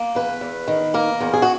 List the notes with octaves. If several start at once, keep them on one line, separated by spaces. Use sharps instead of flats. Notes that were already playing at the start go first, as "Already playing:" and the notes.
Already playing: A#3
E2 B4
E2
D#3
A#3 A#4
E2
G#4
F#4